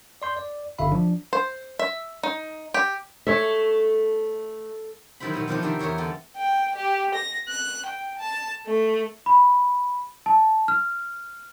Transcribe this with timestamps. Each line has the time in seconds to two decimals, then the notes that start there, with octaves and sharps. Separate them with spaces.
0.22 D5 C6 G6
0.37 D5
0.78 G1 D3 E5 F5 B5
0.92 F3 D4
1.33 C5
1.79 E5
2.23 D#4
2.74 G4
3.27 A3 C#5 E5
5.20 D#3 F#3 G3 E4 C5 B5
5.34 B2 D#3 B3
5.48 C3 D#3 F3 B3 D4 G4
5.62 C3 D#3 A#4 D5 E5
5.79 E2 D#4 A#4 C#5 E5
5.98 D3 G3 B3 A4
6.37 G5
6.76 G4
7.15 A#6
7.49 F#6
7.86 G5
8.19 A5
8.67 A3
9.26 B5
10.26 A5
10.68 F6